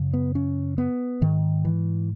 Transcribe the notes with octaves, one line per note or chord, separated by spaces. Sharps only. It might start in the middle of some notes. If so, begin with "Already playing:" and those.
Already playing: F#2 C#3
B3
C#4
B3
G#2 D#3
E3